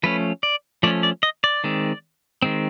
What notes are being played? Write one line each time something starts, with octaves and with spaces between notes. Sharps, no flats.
F3 A3 C#4 B4
D5
F3 A3 C#4 D5
D5
D#5
D5
D#3 G#3 C4
D#3 G#3 C4